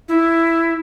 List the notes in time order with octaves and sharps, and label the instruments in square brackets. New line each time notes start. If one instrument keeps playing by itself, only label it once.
[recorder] E4